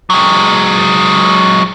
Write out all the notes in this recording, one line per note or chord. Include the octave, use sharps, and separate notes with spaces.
F#3 G#3